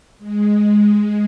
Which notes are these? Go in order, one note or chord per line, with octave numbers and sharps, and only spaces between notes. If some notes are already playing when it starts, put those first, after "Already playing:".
G#3